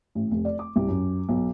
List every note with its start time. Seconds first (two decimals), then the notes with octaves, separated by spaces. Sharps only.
0.15 A1
0.31 F1
0.45 D5
0.59 D6
0.76 C2
0.88 F#2
1.29 B1